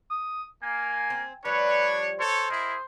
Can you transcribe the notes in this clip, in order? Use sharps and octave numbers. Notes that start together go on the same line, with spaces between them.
D#6
A#3 G#5
C4
F3 G3 D4 B4 C#5
A4 C5 C#5
E4 G#4 A#4 D#5